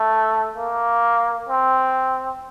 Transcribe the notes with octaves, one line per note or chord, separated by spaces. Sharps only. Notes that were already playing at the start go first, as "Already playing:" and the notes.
Already playing: A3
A#3
C4